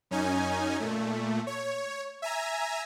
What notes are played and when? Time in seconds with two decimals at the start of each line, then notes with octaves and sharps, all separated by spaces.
0.11 F#2 C#4 D#4 G#5
0.80 A#2 A3
1.47 C#5
2.22 E5 G#5 A#5